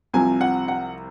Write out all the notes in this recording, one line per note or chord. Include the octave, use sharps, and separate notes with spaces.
C2 C3 F3 G#5
F#5
F#5